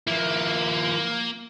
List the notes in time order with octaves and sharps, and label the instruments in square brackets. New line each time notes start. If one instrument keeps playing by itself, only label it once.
[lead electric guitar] F3 E4 [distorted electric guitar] A#3